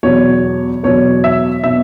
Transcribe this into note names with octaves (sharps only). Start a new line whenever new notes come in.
E2 B2 F#3 C#5
E2 B2 F#3 C#5
E5
B2 F#3 E5